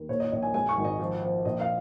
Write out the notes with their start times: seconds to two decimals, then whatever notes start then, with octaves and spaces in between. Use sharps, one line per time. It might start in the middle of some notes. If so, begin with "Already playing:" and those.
Already playing: D#2
0.09 A#2 C#5
0.20 D#5
0.32 A#1 D#5
0.42 G#5
0.54 G#3 G#5
0.69 C#6
0.77 G#1
0.84 D#5
1.00 F3
1.22 F3
1.45 A#1 D#5
1.60 F5